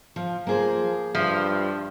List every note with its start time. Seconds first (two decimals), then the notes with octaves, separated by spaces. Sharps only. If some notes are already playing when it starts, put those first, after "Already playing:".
0.16 F3
0.47 F3 A#3 G#4 C5
1.15 G2 F3 E5